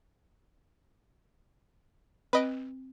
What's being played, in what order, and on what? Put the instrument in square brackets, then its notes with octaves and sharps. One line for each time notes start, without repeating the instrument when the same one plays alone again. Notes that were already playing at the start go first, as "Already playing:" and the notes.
[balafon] C4 [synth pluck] B4 D#5 D7